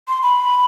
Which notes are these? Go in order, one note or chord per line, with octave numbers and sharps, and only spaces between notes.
C6
B5